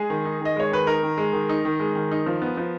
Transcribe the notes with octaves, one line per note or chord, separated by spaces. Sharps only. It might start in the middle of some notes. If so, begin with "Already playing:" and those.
Already playing: G#3 G#4
D#3
D#4
D#3 D#5
G#3 C#5
D#3 B4
D#4 A#4
D#3
G#3
D#3
D#4
D#3
G#3
D#3
D#4
F3
B3
F3